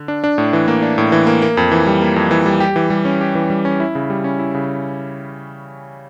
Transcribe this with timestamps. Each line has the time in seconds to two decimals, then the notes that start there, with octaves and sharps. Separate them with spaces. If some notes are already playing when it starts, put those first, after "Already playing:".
Already playing: D3
0.08 D4
0.24 D4
0.38 A2
0.53 E3
0.68 A#3
0.82 D4
0.98 A2
1.12 E3
1.27 A#3
1.42 A#3
1.57 F2
1.72 E3
1.87 G3
2.02 A#3
2.16 F2
2.31 E3
2.46 G3
2.60 G4
2.76 E3
2.90 G3
3.05 C#4
3.21 G4
3.35 E3
3.50 G3
3.65 C#4
3.80 E4
3.95 C#3
4.10 G3
4.24 C#4
4.39 E4
4.55 C#3